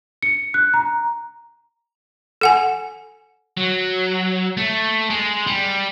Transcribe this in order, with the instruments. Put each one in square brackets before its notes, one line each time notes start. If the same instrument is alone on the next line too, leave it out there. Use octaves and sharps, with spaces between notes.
[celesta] C#7
F#6
A#5
[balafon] A4 F#5 G#5
[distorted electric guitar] F#3
A3
G#3
G3